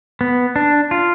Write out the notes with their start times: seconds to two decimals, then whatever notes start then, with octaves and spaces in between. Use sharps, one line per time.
0.21 B3
0.56 D4
0.91 F4